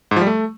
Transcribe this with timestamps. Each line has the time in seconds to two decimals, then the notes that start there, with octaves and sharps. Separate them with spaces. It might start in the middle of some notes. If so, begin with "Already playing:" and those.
0.11 G#2
0.16 F3
0.21 G3
0.27 A3